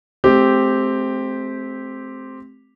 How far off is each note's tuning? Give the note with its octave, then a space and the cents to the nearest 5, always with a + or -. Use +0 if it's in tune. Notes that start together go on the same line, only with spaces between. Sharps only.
A3 -40 C4 +0 G4 +0